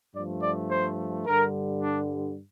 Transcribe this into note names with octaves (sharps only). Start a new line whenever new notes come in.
G2 F3 A3 D5
D5
C5
G2 D3 G3 A#4
D4